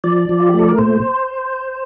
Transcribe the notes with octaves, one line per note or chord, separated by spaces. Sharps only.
F3 D5
F3
F4
A3 G4
A4
A#4
A#2 C5